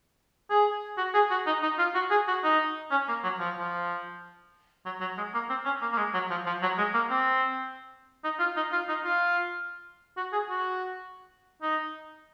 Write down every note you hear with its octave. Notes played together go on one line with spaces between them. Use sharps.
G#4
F#4
G#4
F#4
D#4
D#4
F4
F#4
G#4
F#4
D#4
C#4
A#3
F#3
F3
F3
F#3
F#3
G#3
A#3
C4
C#4
A#3
A#3
G#3
F#3
F3
F3
F#3
G#3
A#3
C4
D#4
F4
D#4
F4
D#4
F4
F#4
G#4
F#4
D#4